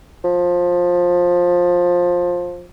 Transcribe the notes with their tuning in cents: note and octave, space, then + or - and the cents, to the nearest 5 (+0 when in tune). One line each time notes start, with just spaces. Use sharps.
F3 +15